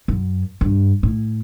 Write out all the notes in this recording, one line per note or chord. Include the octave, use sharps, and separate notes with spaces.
F#2
G2
A2